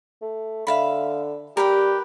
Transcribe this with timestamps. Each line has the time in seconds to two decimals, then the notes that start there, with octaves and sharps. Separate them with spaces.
0.21 A3
0.67 D3 E5 F5 B5
1.57 G3 G4 A#4 B4 G5